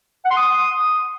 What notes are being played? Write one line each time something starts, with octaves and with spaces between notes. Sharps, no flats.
F#5
C6
D#6